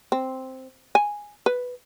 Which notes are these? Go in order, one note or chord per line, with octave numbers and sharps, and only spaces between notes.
C4
G#5
B4